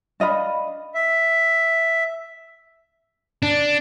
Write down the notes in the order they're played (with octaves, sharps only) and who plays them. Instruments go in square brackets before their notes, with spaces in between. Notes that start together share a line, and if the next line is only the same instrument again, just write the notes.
[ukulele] D4 D#5 F5 B5
[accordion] E5
[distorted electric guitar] D4